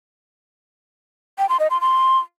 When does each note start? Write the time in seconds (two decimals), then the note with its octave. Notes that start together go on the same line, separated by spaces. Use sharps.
1.38 G5
1.49 C6
1.60 D#5
1.70 C6
1.81 C6